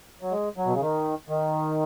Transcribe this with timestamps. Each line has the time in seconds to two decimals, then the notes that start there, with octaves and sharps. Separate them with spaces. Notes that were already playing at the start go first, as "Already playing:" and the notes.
0.21 F#3
0.32 G#3
0.57 F#3
0.65 B2
0.73 C#3
0.81 D#3
1.29 D#3